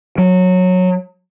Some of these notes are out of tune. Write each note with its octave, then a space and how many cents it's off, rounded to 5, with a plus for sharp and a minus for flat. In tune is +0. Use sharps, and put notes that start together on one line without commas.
F#3 -15